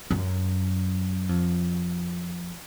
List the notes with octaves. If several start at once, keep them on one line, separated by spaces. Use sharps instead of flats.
F#2
F2